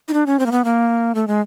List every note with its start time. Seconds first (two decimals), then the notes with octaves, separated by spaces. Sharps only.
0.08 D#4
0.13 D4
0.26 C#4
0.39 C4
0.46 A#3
0.52 B3
0.64 A#3
1.15 A3
1.28 G#3